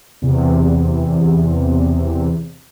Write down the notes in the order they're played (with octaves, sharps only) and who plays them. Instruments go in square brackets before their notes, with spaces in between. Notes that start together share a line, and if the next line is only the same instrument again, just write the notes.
[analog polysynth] E2 C3